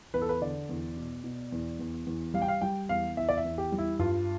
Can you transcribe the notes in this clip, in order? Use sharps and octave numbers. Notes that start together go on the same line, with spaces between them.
E2 B4
A4
B4
D3 D5
E2
B2
B2
E2
E2
E2
G3 F5
G5
F5
G3 G5
E2 F5
E2 E5
D5
E5
E2
G4
G3
E4
G2 F4